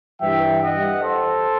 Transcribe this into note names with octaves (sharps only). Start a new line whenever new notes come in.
G2 E3 G3 E5 G5
D#5 F#5
A4 C5